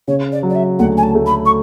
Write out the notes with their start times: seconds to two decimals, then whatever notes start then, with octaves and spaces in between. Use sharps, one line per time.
0.08 C#3 C#5
0.32 D5
0.43 F#3
0.50 D5
0.55 E5
0.79 D2 F#5
0.97 G#5
1.03 A5
1.15 A3
1.26 B5
1.45 C#6